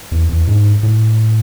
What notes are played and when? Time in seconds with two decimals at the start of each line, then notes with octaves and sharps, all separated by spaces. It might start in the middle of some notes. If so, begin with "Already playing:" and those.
0.12 E2
0.29 E2
0.47 G#2
0.83 A2